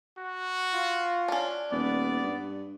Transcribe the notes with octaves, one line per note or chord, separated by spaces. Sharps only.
F#4
F4
C#4 D4
D#1 B3 D5
G2